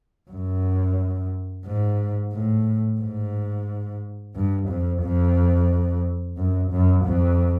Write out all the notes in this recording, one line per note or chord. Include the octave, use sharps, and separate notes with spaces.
F#2
G#2
A2
G#2
G2
F2
F2
F#2
F#2
F2